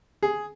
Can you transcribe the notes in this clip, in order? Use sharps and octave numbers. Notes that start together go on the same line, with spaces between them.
G#4